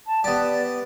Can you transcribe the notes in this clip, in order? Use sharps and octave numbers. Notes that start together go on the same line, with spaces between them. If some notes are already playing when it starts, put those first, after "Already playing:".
A5
B3 G4 D5